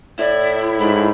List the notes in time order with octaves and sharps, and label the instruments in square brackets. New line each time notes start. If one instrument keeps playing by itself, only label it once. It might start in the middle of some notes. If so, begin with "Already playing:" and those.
[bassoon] A2 [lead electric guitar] E4 [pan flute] D5
[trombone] G#2 [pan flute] B5